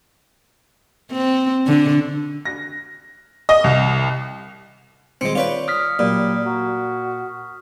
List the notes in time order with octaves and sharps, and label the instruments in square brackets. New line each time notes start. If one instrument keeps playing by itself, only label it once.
[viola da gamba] C4
D3
[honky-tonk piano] A#6
D#5
C2
[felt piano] D#1 G3 C#7 [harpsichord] G#3 C4
[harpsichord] F4 B4 G5 [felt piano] C#5 D5
[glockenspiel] D#6 F6 B6
[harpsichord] A#2 [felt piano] F#3 [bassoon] G3
[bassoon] F#4 [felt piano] A#5